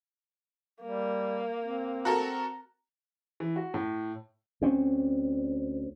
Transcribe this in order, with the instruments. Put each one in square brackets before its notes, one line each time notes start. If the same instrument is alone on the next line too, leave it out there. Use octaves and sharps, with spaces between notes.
[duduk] G3 [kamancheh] A#3
[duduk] C4
[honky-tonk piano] F#4 A4 A#4 [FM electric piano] A#5
[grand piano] E3
F#4
A2
[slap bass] D2 C4 C#4